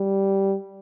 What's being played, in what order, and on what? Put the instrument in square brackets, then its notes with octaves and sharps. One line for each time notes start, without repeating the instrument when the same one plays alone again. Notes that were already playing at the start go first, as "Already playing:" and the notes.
Already playing: [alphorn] G3